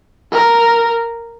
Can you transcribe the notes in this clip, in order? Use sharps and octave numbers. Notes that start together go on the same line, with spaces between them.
A#4